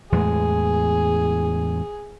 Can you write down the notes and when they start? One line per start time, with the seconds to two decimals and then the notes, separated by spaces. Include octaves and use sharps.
0.12 E2 A2 G#3 G#4